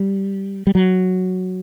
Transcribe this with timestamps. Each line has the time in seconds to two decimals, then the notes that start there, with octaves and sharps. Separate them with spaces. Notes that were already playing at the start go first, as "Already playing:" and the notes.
Already playing: G3
0.67 G3
0.75 F#3